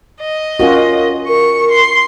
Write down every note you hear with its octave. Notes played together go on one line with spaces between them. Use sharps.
D#5
C#4 F4 F#4 A#4
A#4 C#6
C6